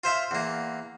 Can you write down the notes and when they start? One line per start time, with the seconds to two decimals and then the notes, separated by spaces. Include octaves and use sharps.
0.04 F4 C5 E5 F5
0.31 E2 A#3